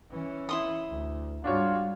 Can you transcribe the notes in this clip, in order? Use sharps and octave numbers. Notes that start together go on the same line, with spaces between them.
E3 C#4
E4 C6 D#6
D2
G#2 G3 D4 F4 F#4 C#5